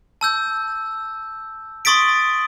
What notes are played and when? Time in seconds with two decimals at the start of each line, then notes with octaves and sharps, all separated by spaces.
0.21 A5 E6 G6
1.85 C6 C#6 D#6 A6 B6 D7